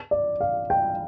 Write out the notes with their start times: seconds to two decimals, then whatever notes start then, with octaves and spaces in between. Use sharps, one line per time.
0.11 D5
0.41 F5
0.70 G5